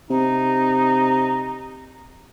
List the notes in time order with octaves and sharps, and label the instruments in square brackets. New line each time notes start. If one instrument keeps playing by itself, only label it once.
[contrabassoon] C3 [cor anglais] D#4